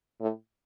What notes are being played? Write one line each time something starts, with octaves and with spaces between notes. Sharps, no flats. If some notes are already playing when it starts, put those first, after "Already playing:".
A2